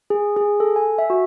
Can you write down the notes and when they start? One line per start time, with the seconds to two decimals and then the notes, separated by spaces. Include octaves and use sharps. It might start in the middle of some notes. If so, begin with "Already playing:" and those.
0.10 G#4
0.36 G#4
0.60 A4
0.76 G#5
0.98 E5
1.10 F#4